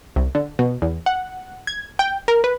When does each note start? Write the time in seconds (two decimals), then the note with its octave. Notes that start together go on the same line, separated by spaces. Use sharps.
0.16 C2
0.35 D3
0.59 B2
0.82 E2
1.06 F#5
1.67 G#6
1.99 G5
2.28 A#4
2.44 B4